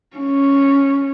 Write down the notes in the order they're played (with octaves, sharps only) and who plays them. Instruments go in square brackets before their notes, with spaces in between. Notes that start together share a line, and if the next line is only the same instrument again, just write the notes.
[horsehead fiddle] C#4